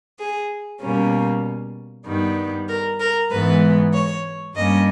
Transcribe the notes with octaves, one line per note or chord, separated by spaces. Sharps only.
G#4
B2 G3 A#3 C#4
G2 D#3 G3 B3
A#4
A#4
G#2 E3 G#3 B3 B4
C#5
G2 G3 A#3 C#4 D#5